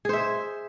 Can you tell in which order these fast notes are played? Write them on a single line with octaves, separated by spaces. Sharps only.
G#4 C5 E5